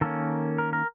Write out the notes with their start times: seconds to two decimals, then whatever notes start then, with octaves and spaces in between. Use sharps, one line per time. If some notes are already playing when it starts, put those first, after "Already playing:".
0.01 D#3 A#3 C#4 A4
0.58 A#4
0.73 A#4